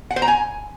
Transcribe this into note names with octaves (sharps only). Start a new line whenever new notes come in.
F#5
C5
A#5
G#5